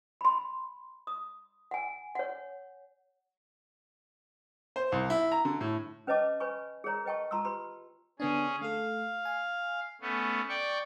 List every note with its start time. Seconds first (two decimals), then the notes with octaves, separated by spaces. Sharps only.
0.21 B5 C6
1.07 D#6
1.71 F#5 G#5
2.15 C#5 F#5
4.76 C5
4.92 C2
5.10 E4
5.32 A#5
5.45 D3
5.61 A2
6.07 C#4 B4 C#5 D#5 A5 D6
6.40 B4 C#5 G#5 B5 C#6
6.84 G#4 A#4 C#5 A#5
7.05 B4 D#5 G5 A5 C#6
7.31 F4 A5 A#5 C6 C#6 E6
7.45 G4 B4 B5 C6
8.20 D3 B3 C#4 D4 G#4
8.61 A3 A4 F5
9.25 G#5
10.01 A3 B3 C#4
10.49 D5 G5 C#6